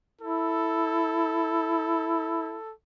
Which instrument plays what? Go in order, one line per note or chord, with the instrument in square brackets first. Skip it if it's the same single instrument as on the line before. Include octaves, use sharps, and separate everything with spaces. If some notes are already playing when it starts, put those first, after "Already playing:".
[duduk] E4 [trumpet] A4